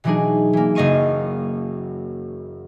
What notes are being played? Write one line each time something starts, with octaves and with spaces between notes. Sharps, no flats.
B2 E3 F#3 D4 D#4 G#4
E3 A#3
F#1 F#2 D#5 F5 C#6 D#7